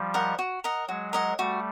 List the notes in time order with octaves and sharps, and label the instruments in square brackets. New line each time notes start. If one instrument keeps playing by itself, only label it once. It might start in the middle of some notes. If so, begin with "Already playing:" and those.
Already playing: [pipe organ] F3 G3
[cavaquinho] A#4 D#5 F#5
F#4
A#4 D#5 F#5
[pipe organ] F#3 G#3 [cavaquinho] F#4
[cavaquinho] A#4 D#5 F#5
[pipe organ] G3 A3 [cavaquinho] F#4